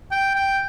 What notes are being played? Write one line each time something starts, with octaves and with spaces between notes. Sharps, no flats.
G5
G5